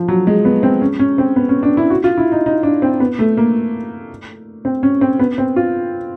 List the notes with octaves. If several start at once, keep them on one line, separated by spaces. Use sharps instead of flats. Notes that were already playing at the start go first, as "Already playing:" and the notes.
Already playing: F3
F#3
G#3
B3
C4
C#4
C#4
C4
B3
C#4
D4
E4
F#4
F4
E4
D#4
D#4
D4
C4
B3
A3
A#3
C4
C#4
C4
B3
C4
F4